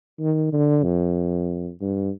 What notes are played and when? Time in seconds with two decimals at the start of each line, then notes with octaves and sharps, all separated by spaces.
0.20 D#3
0.53 D3
0.84 F2
1.81 G2